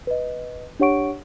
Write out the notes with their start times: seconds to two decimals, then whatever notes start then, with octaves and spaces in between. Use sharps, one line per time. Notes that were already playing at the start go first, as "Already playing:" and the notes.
0.07 B4 D#5
0.80 D4 G4 C#5 F#5 C#6 D7